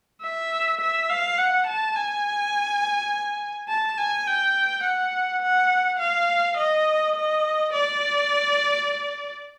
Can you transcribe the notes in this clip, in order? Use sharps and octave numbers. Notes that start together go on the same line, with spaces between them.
E5
E5
F5
F#5
A5
G#5
A5
G#5
G5
F#5
F#5
F5
D#5
D#5
D5